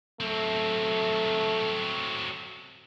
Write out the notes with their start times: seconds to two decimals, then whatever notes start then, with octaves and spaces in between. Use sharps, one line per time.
0.20 F#3 A3 C4